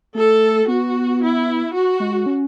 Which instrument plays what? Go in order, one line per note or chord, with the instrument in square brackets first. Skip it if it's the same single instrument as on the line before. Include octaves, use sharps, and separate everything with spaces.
[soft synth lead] A3 [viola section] A4
[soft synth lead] B3 [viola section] F#4
[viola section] E4
F#4
[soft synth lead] G#3
C#4